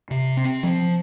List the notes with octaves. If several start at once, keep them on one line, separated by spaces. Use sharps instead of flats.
C3
C4
F3